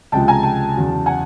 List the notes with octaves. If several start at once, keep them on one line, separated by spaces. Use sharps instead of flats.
C#2 C3 F3 G#3 G5 A5
G#5 A#5
G5 A5
E2 C#3 F#3
F#5 G#5